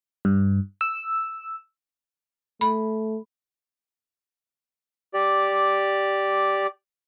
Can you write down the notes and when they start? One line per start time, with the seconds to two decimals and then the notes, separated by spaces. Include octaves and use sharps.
0.25 G2
0.81 E6
2.61 A3 B5
5.14 G4 D5